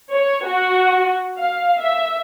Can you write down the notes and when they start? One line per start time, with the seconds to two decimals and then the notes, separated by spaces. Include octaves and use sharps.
0.13 C#5
0.47 F#4
1.40 F5
1.80 E5